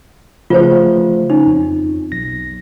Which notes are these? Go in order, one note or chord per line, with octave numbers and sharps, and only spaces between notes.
C#3 F3 A3 F4 B4 C5
C#4 D#4
F2
B1 A#6